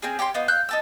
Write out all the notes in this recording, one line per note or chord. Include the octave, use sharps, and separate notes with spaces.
C4 C#4 G#4
G4 C#5 A#5 C6
B3 D#4 F4
F5 E6 F#6 G6
D#4 A5 E6